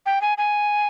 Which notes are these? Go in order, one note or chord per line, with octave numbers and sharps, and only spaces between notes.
G5
G#5
G#5